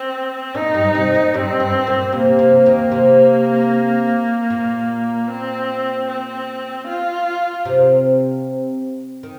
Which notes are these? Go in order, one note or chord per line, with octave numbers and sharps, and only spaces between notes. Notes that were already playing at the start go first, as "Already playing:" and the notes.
Already playing: C4
A#2 A#3 D#4
G2 G3
C3 C4
A#2 A#3
G2 G3 C4
G2
A#2
C3 A#3
C3
D#2 D#3
C3
A#2
C4
C4
F4
C3
D#3